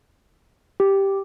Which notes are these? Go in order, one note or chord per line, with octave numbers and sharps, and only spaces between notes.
G4